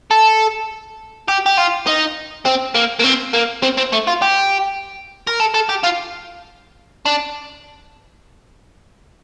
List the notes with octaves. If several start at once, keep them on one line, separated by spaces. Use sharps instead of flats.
A4
G4
G4
F4
D#4
C4
A#3
A#3
C4
A#3
C4
C4
A3
F4
G4
A#4
A4
A4
G4
F4
D4